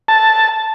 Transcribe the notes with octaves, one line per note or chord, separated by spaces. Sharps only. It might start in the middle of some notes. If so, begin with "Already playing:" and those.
A5